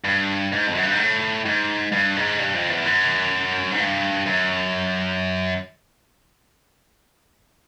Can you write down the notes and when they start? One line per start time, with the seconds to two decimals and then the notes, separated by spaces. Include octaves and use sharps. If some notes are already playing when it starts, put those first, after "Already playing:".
0.04 G2
0.52 G#2
0.67 F2
0.75 F#2
0.83 G2
0.91 G#2
0.99 A2
1.46 G#2
1.92 G2
2.16 G#2
2.39 G2
2.54 F2
2.70 E2
2.86 F#2
3.71 G#2
3.80 G2
4.26 F#2